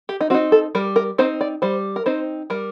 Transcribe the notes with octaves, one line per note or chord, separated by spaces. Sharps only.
G4
D#4
C4 D#4 F#4
A4
G3 A#4
A#4
C4 D#4 C5
D5
G3 C5
A#4
C4 D#4 C5
G3 A#4